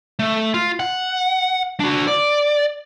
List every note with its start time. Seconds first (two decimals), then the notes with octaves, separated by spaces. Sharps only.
0.19 A3
0.54 F4
0.80 F#5
1.80 D4 F#4
2.07 D5